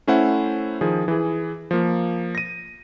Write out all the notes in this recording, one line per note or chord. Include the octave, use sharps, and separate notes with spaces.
A3 C#4 E4 C5 F#5
D#3 F3 G#4
E3 G#4
F3 A#3
A#6 D#7